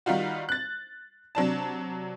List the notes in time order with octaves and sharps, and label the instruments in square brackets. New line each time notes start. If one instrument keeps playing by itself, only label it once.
[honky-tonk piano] D#3 G3 D#4 F4 F#4
F#6 A6
C3 F#3 D4 A5